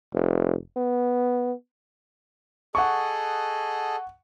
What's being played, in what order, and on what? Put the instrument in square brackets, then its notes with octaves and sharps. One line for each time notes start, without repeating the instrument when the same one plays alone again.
[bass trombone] F1
B3
[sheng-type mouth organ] G#4 A4 D#5 [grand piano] F#5 C#6